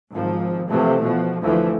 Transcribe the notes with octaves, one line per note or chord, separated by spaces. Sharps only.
G#1 F3
C3 E3 F3 A3
B2 F3
D2 E3 F3 A3